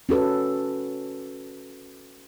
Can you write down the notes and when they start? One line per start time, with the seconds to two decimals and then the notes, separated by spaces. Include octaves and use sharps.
0.09 C#4 F#4 A4 B4